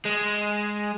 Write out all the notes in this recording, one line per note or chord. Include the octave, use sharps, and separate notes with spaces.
G#3